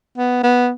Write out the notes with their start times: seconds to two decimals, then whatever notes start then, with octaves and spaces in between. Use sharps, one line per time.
0.18 B3
0.44 B3